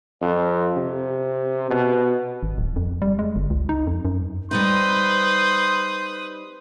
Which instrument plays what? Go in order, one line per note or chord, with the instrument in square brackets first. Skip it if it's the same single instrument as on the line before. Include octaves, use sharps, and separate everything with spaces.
[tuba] F2
C3
B2
[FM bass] G#1
D1
F2
G3
G#3
G1
C#2
D#4
F2
F#2
[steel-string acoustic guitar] G3 C4 D#4 [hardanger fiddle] B4 D#6 [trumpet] C6 [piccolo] G6